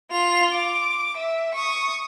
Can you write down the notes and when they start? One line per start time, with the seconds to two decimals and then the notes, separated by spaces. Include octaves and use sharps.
0.11 F4 F7
0.54 D6
1.17 E5
1.55 C#6 D#6